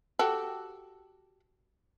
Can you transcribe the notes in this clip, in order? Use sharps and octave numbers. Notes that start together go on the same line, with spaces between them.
F#4 G4 A4